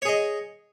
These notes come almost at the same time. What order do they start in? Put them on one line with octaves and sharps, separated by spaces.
C#5 G#4 D#5